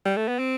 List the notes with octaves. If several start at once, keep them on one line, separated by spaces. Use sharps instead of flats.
G3
A3
B3
C4